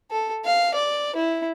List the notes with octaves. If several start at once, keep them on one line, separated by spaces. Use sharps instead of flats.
A4
F5
D5
E4